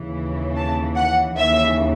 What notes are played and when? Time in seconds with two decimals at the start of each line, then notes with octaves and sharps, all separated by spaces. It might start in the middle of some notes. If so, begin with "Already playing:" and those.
Already playing: D#2 C#3 E3
0.56 A5
0.95 F#5
1.36 D#2 C#3 E3 E5